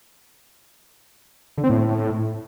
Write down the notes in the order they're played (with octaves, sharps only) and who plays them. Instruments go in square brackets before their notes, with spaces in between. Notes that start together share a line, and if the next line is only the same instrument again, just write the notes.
[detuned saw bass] D3
C4
A2